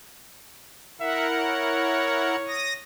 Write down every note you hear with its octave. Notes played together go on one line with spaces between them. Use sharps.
E4 A#4 E5 F#5
C#5
D#6 A#6